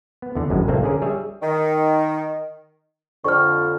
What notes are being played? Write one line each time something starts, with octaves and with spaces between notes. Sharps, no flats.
B3
E2 D3
G#1 F#2 A2 G#3
C2 F2 A2 A3 A#3 C4
D3 C#4 G#4 A#4
G3 G#4 C#5 E5
D#3
F2 D3 C#6 F6